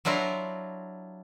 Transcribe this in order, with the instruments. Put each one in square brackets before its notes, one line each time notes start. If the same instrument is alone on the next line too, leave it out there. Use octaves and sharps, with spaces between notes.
[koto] F#3 D4 E4 F4 A#4